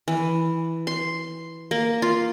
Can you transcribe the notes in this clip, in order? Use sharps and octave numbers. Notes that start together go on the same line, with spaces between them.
E3
C6
A#3
F4